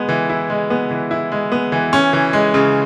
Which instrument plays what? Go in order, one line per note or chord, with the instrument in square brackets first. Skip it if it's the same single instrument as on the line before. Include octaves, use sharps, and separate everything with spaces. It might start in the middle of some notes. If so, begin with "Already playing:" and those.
Already playing: [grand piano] G#3 B3
E3
E4
G#3
B3
E3
E4
G#3
B3
E3
C#4
E3
G#3
C#3